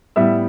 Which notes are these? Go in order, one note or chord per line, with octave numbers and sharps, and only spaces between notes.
A2 G3 B3 E4 E5